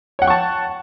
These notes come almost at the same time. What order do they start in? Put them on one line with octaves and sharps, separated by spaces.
C#5 F#5 G5 C#6 A5